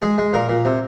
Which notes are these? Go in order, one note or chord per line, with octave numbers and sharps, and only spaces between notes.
G#3 G#4
G#3
A#2 A#4
A#2
C3